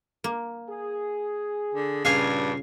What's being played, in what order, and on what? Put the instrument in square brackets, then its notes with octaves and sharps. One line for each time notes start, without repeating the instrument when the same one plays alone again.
[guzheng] A#3
[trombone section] G#4
[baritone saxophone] D3
[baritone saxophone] G2 [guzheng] A#2 C#3 [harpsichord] F5 G#5